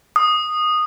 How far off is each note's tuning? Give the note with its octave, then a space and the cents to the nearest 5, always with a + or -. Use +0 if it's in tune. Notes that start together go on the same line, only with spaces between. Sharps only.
D#6 -15